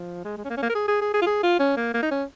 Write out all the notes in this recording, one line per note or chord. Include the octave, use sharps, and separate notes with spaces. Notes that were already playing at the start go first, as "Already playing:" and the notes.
Already playing: F3
G#3
G#3
C#4
A#3
C#4
A#3
A#4
G#4
G#4
G#4
G#4
F4
G#4
F4
C#4
A#3
A#3
D#4
C#4